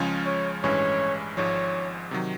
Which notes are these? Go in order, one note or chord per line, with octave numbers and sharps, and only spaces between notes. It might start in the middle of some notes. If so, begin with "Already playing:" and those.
Already playing: C#2 C#3 F3 G#3 C#4
C#5
A1 G2 E3 G#3 C#4 C#5
G#1 G#2 F3 C#5
C3 D#3 F#3